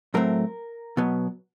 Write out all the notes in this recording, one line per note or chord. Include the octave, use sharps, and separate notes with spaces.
A2 F#3 A3 C4 A#4
B2 F#3 B3